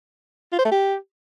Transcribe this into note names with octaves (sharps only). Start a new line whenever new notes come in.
F4
C5
A3
G4